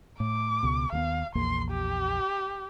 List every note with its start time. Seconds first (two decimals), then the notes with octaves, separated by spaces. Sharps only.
0.20 A2 D6
0.63 C#2 B2
0.92 D#2 A#3 B3 F5
1.35 A#1 E2 A#3 C6
1.71 G4